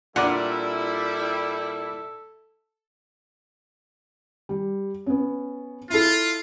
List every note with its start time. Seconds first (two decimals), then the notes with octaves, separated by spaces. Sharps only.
0.16 A#2 G3 D4 E4 A4 D5 F#5
4.49 G3
5.06 B3 C#4
5.90 E4 F4 A4